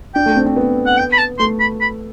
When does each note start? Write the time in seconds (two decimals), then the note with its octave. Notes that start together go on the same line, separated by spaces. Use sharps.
0.15 D4 G5
0.26 A3
0.36 C4
0.46 C4
0.56 B3
0.86 F#5
0.98 G5
1.13 B5
1.18 A5
1.39 A3 C6
1.60 B5
1.81 B5